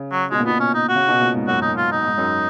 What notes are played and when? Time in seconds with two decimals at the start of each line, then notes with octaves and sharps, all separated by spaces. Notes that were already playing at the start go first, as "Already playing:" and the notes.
Already playing: C#3
0.11 F#3
0.31 B2 G#3
0.40 A#2
0.46 B2 B3
0.60 C#4
0.75 D#4
0.89 F#4
0.96 C#3
1.08 B2
1.21 A#2
1.35 G#2
1.47 F#2 F#4
1.62 D#4
1.77 F4
1.92 D#4
2.06 G#2
2.18 F#2